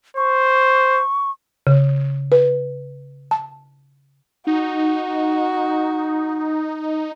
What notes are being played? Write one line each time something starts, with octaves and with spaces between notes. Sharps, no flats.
C5 C#6
C#3
B4
A5
D#4 F#4